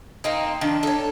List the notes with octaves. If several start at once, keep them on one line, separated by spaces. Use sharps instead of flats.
A#3 C4 D#4
D#3 F3 D4
A4 C#5